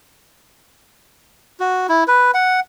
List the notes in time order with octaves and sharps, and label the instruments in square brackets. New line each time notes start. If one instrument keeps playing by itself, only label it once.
[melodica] F#4
E4
B4
F#5